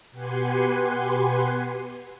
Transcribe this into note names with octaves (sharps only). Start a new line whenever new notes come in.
B2 G4 B4 F#5 G#5 C6